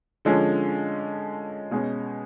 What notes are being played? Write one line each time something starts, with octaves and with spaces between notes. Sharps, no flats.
D3 F3 G#3 C#4
B2 G#3 C#4